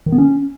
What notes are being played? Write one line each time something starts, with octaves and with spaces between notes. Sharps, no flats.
D#3
B3
C#4